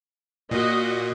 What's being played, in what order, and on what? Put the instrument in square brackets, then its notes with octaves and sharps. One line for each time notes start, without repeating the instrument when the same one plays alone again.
[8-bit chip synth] A#2 [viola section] F#4 D#5